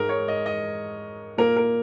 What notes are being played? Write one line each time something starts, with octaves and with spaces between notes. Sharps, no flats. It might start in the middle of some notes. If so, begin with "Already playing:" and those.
Already playing: G#2 G#3 A#4
C#5
D#5
D#5
A#2 A#3 A#4
A#4